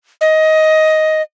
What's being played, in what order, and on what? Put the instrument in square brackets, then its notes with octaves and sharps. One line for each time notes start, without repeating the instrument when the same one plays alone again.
[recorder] D#5